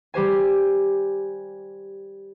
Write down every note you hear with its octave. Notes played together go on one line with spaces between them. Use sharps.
G3 G4 C5 G#5